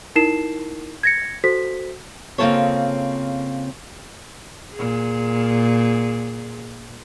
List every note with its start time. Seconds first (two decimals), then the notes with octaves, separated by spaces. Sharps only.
0.16 D#4 E4 A#4 C7 E7
1.03 G#6 A#6 C#7
1.44 F#4 A4 C5 B6
2.38 C#3 A#3 C4 F4 A4 C#5
4.75 A#2 G#4